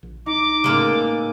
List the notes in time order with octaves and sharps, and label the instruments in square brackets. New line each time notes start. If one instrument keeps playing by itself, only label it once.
[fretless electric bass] A#1
[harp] D#4 [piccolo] D6
[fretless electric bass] A2 C#3 [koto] G#3 A#3 A4 [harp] B3